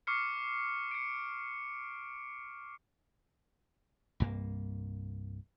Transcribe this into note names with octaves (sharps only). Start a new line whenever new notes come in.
C#6 D6 F6 C7 C#7
C#7 D7
C2 G2 A#3